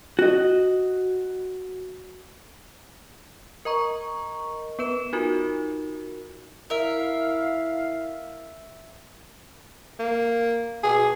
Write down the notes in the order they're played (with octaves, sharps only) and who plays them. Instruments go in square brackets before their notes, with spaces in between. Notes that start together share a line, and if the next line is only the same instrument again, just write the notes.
[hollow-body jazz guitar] F#4 D#5
[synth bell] A#4 D#5 A#5 C#6
B3 B4 E7
D#4 F4 F#4 A#4
[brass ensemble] E4 F5 [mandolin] A#4 E5
[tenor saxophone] A#3
[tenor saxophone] B2 [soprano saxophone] G#4